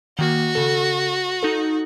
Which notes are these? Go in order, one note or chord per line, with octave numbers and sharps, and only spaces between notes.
D#3 A#3 F#4
C#3 A4
D#4 A4